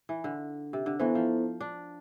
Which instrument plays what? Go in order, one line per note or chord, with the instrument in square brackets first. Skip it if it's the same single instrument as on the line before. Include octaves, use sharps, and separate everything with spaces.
[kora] E3
D3
C3
D3
[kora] E3 [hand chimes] B3 E4 A4 C5
[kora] F3
D4